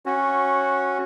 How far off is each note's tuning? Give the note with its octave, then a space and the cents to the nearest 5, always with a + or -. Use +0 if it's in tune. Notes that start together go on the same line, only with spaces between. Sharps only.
C#4 -15 F#4 -5